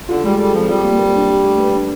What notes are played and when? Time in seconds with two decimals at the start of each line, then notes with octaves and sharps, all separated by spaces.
0.09 D3 F4
0.24 G3 G#3
0.38 G3 A4
0.54 F3 C4
0.69 G3 F4
0.84 A#3
0.98 A#4
1.14 D4
1.29 G4
1.44 A3
1.58 B4
1.73 D4